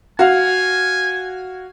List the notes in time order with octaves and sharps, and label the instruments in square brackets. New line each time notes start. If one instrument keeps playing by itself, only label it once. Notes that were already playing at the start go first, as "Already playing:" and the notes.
[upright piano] F#4 F5 [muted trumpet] G#5